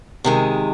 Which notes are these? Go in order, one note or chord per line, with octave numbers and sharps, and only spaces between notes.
C3 D#3 G#3